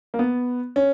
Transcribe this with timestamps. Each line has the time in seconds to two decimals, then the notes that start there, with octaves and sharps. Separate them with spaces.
0.14 A#3
0.19 B3
0.76 C#4